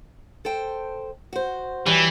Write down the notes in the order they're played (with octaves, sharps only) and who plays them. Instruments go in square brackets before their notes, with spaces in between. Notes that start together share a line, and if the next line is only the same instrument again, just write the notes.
[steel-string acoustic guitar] A4 C5 G5
F#4 C5
[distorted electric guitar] E3 [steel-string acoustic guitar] F#3 G3